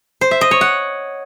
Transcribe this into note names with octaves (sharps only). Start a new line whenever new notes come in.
C5
E5
D#5
C#5
F#5